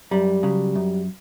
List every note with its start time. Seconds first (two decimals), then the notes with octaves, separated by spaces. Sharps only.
0.11 F#2 G3
0.43 C#3 F#3
0.75 F#2